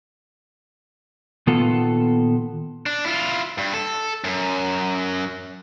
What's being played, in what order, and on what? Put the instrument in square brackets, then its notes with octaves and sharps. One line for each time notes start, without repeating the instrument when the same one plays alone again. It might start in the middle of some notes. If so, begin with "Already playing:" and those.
[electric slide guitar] A#2 D#3 B3 F4 A4
[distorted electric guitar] D4
E4 F4
G2
A4
F#2